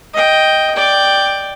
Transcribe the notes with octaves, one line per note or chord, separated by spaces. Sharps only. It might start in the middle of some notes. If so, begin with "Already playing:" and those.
D#5 G5
D5 G5